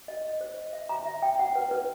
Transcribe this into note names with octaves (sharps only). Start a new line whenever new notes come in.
D#5
D#5
C5
D#5
E5
A#5
E5
G5
F#5
B4
B4